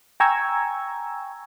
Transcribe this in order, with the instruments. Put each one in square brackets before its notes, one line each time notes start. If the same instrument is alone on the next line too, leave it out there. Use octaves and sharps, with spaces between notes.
[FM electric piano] G5 G#5 A#5 C#6 E6 G#6